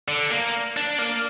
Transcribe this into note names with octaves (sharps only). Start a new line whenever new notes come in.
D3
A#3
D4
A#3